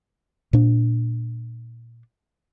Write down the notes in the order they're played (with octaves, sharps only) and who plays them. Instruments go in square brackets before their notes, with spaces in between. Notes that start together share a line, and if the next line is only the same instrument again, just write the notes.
[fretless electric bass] A#2 D4